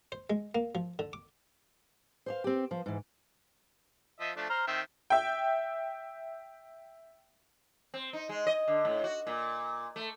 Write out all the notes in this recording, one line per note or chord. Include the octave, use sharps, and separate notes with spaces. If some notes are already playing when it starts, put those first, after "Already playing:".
C5
G#3
A#3
F3
D3
D6
C5 D5 F5
C4 G4
F3 C5
G#2 E3
F3 D#5 E5
F3 A3 D4
C5 A#5 F6
D#3 C4 E5
E5 G5
C4
D#4
G#3
D#5
D3
A2
F#4
A#2
A3